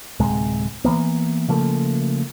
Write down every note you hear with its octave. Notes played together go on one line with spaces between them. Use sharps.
D1 C3 G#3
E3 A#3 B3
C#3 F3 A3 A#3